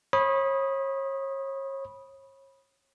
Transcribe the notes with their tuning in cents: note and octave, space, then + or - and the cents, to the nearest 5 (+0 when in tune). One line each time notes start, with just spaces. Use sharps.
C#5 -35 B5 -15 D#6 +0